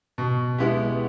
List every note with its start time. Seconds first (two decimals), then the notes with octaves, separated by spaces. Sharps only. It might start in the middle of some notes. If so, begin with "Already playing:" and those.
0.18 B2
0.58 G#3 B3 E4 G4